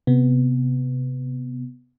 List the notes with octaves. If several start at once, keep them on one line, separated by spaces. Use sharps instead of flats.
C3 B3